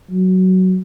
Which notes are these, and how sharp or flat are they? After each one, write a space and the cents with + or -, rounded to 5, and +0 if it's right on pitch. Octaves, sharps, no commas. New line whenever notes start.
F#3 +10